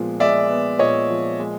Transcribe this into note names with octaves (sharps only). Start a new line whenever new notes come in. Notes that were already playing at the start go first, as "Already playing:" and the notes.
Already playing: A#2 F3 G#3 B3
G#3 D5 E5
B3
A#2 C#5 D#5
F3
G#3